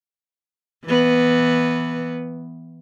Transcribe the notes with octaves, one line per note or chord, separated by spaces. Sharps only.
E3 B3